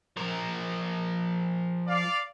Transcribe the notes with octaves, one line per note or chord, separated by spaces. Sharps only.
F3 A#4
D5 F5